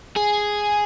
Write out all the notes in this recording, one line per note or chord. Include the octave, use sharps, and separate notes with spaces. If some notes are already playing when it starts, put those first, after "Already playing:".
G#4